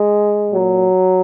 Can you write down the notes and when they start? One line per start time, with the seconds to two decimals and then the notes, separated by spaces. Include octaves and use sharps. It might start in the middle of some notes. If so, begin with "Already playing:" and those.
Already playing: G#3
0.51 A#2 F#3